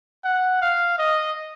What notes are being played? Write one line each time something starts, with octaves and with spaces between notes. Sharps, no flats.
F#5
F5
D#5